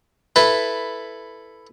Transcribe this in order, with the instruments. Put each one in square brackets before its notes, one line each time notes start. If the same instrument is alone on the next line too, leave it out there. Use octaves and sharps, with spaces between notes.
[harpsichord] E4 A4 B4